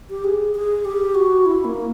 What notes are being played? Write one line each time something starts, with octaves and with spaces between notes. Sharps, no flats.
G4
G#4
G#4
G4
F#4
E4
A#3